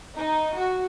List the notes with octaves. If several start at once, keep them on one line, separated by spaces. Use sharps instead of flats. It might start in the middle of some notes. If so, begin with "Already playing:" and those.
D#4
F#4